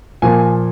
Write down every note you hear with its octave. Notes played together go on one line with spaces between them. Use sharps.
A#2 F3 A#3 G#5